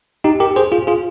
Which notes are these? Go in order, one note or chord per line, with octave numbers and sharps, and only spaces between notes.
D#4 G4
G4 A#4
G#4 C5
F4 G#4
F4 G#4